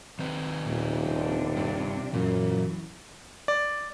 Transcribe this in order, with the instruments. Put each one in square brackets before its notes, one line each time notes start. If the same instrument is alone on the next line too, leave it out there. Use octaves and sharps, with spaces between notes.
[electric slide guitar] D#3 C4 B4
[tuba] D#1 [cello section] A#2
[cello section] C3 D4
[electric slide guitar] G2
[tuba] F#2 [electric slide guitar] A#2 [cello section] E3 F#3
[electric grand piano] D5